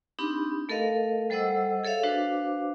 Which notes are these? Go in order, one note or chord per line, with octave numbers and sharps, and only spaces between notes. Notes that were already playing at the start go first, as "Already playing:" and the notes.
C4 D4 D#4 G4 B5
A3 A4 A#4 D#5 F5
G3 A4 C5 D#5 F#5 E6
G#4 A4 C#5 E5 F5
D4 F#4 B4 C5 F5 D6